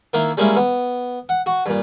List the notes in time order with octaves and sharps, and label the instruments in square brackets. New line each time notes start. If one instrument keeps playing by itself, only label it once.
[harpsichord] D#3 A#3 E4
G3 G#3 A#3 C#4 E4
B3
F#5
F#4
G2 A#2